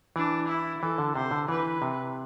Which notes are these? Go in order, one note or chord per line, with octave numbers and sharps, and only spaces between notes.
E3 D4
E4
E3 A4
D3
C3 C5
D3
E3 B4
C3